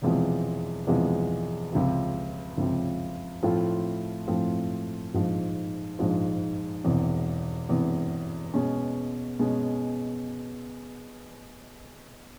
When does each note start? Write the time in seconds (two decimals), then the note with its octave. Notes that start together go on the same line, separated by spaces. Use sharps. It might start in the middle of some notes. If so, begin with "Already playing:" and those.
0.02 E1 E2 C3 F3 G#3
0.87 E1 E2 C3 F3 G#3
1.73 C#2 C3 F3
2.57 C#2 C3 F3
3.43 A2 F3 A3 C4 F4
4.28 A2 F3 A3 C4 F4
5.14 A#1 G#2 F3
5.99 A#1 G#2 F3
6.84 E1 E2 C3
7.69 E1 E2 C3
8.54 B2 G#3 C#4
9.39 B2 G#3 C#4